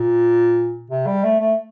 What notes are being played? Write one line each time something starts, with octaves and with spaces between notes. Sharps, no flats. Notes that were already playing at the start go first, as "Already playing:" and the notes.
Already playing: A#2
C3
G3
A3
A3